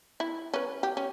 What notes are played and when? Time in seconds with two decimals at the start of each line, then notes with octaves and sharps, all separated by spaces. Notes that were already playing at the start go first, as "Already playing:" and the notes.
0.20 E4
0.54 C#4 B4
0.83 G4
0.97 C#4